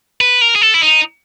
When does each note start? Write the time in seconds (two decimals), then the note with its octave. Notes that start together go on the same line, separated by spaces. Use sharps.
0.21 B4
0.41 A#4
0.56 G#4
0.61 A4
0.74 E4
0.81 D#4